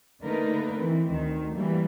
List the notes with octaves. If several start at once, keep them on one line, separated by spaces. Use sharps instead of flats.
D3 A3 A#3 D#4 A#4 B4
E3 C4
D2 D#3
E3 G3 A#3